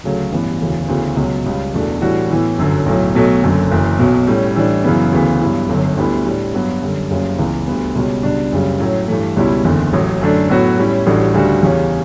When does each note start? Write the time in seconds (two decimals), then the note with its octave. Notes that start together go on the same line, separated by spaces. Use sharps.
0.04 D2 C#3 F#3 A3
0.32 A1 G2 E3 B3
0.61 E1 D2 C#3 E3
0.88 D2 C#3 E3 B3 F#4
1.16 C#2 B2 F#3
1.46 C#2 C#3 G3
1.74 E1 E2 B2 A3 D4
2.01 A2 E3 G3 D4 F#4
2.31 A2 E3 B3
2.58 G1 F#2 D3 F#3
2.86 B1 A2 F#3
3.15 B1 B2 F#3 A3
3.43 F#1 F#2 D3 F#3 A3
3.71 F#1 F#2 E3
3.99 B1 B2 F#3
4.27 A2 G3 C#4
4.56 A2 E3 G3 D4
4.84 F#2 C#3 E3 B3
5.13 D2 C#3 E3 B3
5.41 G2 F#3 B3 E4
5.69 G1 F#2 D3 F#3
5.97 D2 D3 G3 B3 E4
6.26 A2 G3 D4
6.54 G2 F#3 B3 F#4
6.82 F#2 D3 G3
7.10 F#1 F#2 C#3 G3
7.39 C#2 C#3 E3 B3
7.67 D2 D3 G3 B3
7.96 C#2 B2 G3 C#4
8.23 C#2 B2 G3 D4
8.52 F#1 F#2 C#3 G3
8.80 A2 F#3 C#4
9.08 G2 E3 A3
9.36 C#2 B2 G3 C#4 E4
9.65 F#1 E2 D3
9.93 A1 A2 F#3
10.21 F#2 D3 A3 D4
10.49 A2 F#3 B3 F#4
10.78 A2 G3 C#4 E4
11.06 A1 A2 G3 D4 F#4
11.34 D2 C#3 G3 D4 F#4
11.63 E2 C#3 G3 C#4